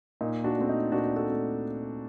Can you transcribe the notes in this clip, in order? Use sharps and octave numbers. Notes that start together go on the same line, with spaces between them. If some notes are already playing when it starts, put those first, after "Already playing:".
A#2 D#4
D4 F#4
A3 C4
D#4
A#2 D4 F#4
F#4 A4
A3 C4